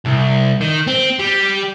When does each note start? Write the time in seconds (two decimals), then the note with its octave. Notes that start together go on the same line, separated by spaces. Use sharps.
0.05 C2
0.61 D#3
0.87 C4
1.19 G3